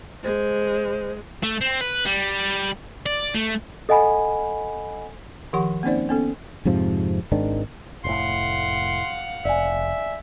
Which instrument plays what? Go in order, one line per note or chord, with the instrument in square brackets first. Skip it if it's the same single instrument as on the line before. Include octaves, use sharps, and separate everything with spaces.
[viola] G#3 [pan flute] C5
[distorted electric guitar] A3
C4
B4
G3
D5
A3
[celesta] A4 D#5 F#5 G#5 B5
[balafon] D#3 F3 G4 F#5 C#6
A#3 C4 C#4 D#4 C5 D5
B3 C#4 A4
[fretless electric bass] F2 G#2 C3 F3
G#1 G#2 D#3 D4
[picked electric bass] F1 A2 [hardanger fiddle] F5 F#5 [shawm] C6
[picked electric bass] F1 [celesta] D5 G#5 [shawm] E5